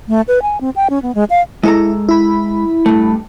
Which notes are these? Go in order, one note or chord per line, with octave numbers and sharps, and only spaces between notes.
A3
B4
G#5
C4
G5
C#4
B3
G#3
F5
G#3 E4 A4 A#5
E4 B5
G2 A3